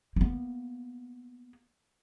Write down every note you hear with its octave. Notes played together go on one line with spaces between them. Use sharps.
A#3 B3